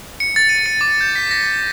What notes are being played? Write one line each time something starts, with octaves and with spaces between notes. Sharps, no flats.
C#7
A6
D#7
C#7
D6
G6
B6
A#6